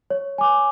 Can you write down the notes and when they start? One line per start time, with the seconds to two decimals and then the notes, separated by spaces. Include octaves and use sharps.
0.10 C#5
0.38 G#5 D6